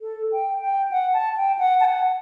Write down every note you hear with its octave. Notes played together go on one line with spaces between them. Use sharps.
A4
G5
G5
F#5
A5
G5
F#5
A5
F#5